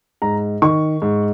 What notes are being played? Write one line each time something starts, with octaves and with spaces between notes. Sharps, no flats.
G#2 A#5
D#3 C#6
G#2